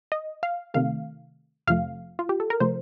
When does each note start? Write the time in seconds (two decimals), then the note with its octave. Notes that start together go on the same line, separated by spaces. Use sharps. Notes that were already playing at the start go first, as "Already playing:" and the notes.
0.12 D#5
0.43 F5
0.74 C3 D#3 A3 F5
1.67 F2 C3 F3 A3 F5
2.19 F4
2.29 G4
2.40 A4
2.50 A#4
2.60 C3 F3 A3 C5